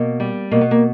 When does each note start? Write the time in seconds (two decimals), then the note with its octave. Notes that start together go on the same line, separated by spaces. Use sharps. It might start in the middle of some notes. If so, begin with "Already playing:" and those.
Already playing: B2 A#3
0.20 G3
0.51 B2 A#3
0.61 B3
0.71 A#3